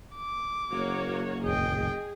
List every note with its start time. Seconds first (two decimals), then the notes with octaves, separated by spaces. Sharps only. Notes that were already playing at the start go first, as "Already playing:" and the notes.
0.16 D6
0.71 F#1 A#3 F#4 C#5
1.44 G1 C#2 G#4 D#5 G5